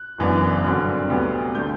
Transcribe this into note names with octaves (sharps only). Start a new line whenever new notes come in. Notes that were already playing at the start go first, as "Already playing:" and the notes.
Already playing: F#6
F#1 F#2 E3 B3 D4
G2 D3 F#3 C4 F#6
D2 C3 F#3 B3
D3 A3 G6